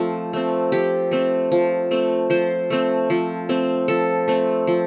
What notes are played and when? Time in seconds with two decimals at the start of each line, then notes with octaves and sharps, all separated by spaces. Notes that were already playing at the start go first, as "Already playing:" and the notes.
Already playing: F3 A3 C4
0.33 A3 C4
0.72 F3 G4
1.11 A3 C4
1.52 F3
1.91 A3 C4
2.30 F3 C5
2.70 A3 C4
3.10 F3
3.49 A3 C4
3.88 F3 A4
4.28 A3 C4
4.67 F3